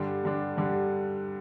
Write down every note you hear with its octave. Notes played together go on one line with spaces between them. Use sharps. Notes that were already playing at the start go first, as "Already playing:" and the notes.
Already playing: G2 D3 G3 D4
G2 D3 G3 D4
G2 D3 G3 D4